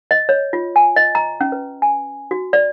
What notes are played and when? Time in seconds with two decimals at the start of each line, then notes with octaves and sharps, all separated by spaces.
0.11 D#5
0.29 C#5
0.53 F4
0.76 G#5
0.96 D#5
1.15 A#5
1.41 C#4
1.52 B4
1.82 G#5
2.31 F#4
2.53 D5